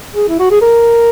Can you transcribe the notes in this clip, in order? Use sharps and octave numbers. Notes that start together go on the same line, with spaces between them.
G#4
E4
F#4
G#4
A#4